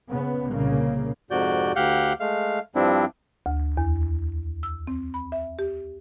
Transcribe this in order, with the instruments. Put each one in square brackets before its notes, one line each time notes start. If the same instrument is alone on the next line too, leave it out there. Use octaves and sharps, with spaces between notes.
[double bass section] C#3 B3
C2 A#2 C#3 A#3
[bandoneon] F2 G#2 C3 F#4 D5 G6
D2 G4 F5 F#5 G6
G#3 A3 F5
G2 F3 G3 C4 D4 E4
[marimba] D2
E2
E6
C4
B5
E5
G4